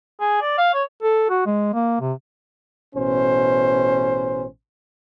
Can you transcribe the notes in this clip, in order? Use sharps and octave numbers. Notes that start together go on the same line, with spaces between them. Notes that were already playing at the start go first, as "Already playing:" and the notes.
G#4
D5
F5
C#5
A4
F#4
G#3
A#3
C3
A1 B2 C#4 C5